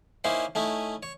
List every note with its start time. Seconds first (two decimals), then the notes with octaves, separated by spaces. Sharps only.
0.24 A#3 C#4 D#4 E4 C5
0.55 A3 C#4 D#4 E4
1.03 C#5